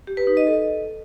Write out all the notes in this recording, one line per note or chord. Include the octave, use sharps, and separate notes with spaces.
G4
B4
D#4
D#5
A4